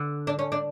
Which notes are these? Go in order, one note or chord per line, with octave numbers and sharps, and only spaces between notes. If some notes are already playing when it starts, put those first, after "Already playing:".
Already playing: D3
D4
C#4
D4